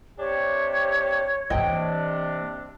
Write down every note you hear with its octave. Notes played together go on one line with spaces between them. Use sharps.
C3 D4 G4 C#5
C3 E3 A#3 D4 D#5 G5